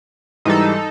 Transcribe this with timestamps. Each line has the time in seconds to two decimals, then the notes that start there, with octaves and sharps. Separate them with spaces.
0.45 G#2 E3 G3 D#4 A4